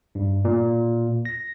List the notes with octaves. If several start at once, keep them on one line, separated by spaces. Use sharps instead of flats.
G2
A#2
A#6